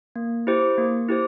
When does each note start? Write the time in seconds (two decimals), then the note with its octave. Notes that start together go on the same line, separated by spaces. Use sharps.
0.16 A#3
0.47 E4 G4 C5
0.78 A#3
1.09 E4 G4 C5